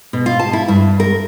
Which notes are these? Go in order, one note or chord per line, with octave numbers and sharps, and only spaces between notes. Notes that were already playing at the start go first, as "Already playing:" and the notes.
B2
F4
A5
E4
G2
A#4